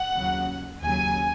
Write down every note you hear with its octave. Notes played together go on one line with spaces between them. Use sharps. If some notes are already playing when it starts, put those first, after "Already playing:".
Already playing: F#5
D#2 C#3 F#3
D#2 C#3 F#3 G#5